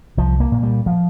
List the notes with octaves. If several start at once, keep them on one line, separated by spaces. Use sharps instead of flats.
C2 F3
A#3
A#2
G3
F3